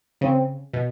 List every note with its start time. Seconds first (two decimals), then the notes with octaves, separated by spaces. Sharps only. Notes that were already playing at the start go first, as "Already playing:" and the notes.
0.21 C#3 C4
0.73 B2